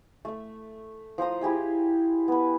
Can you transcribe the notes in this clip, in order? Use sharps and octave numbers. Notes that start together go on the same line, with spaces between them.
A3 E5
F3 C5 A#5 D#6
E4 G4 G#4 E5
B3 B4